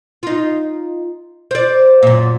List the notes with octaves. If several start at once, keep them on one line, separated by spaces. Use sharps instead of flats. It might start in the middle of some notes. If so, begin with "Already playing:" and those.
D#4 F4
C5 D5
F#2 A#2